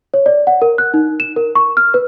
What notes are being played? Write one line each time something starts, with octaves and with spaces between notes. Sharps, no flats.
C#5
D5
F#5
A#4
F#6
D#4
E7
A#4
C#6
F6
B4